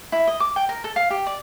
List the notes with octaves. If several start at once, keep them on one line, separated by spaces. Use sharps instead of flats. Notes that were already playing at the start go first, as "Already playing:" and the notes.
E4
D#5
D6
G5
A#4
A4
F5
G4
D5